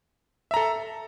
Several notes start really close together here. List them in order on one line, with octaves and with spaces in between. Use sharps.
E5 A#5 A4